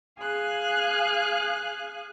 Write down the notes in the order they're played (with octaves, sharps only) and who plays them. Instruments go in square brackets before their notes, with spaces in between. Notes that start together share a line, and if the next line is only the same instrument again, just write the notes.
[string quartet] G#4 F5 G#5 F#6